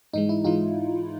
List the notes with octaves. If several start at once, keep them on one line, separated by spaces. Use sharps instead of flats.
G#2 E3 G#3 D#4
E4
G#2 E3 G#3 D#4 F4